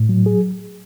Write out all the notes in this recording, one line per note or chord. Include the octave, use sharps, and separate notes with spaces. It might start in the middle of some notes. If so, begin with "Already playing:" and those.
Already playing: A2
F#3
G#4